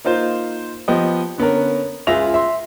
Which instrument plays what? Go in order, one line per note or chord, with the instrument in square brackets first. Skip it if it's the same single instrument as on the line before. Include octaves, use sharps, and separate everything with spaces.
[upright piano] A#3 D#4 F4 C5
F3 B3 G4 D#5
D3 B3 C#4 A#4
C#2 F4 G#4 E5 A#6 F7
E5 C6